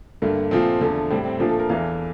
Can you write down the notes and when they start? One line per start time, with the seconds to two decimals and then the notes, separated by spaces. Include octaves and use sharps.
0.22 G2 D3 A3 A#3
0.51 A#2 F3 A3 C4
0.81 E2 D3 F3 A3
1.10 A2 G3 C4
1.25 C4
1.40 A#2 F3 A3 D4
1.49 A4
1.59 A#4
1.69 E2 E3 A3 F5